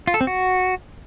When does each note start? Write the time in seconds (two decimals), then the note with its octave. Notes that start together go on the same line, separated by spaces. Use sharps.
0.07 F4
0.14 A4
0.21 C4
0.27 F#4